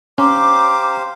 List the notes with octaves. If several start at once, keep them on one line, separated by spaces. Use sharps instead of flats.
C#4 G4 C5 F5 A#5 D6